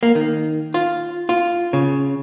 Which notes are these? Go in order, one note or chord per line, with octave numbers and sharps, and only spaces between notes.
A#3
D#3
F4
F4
C#3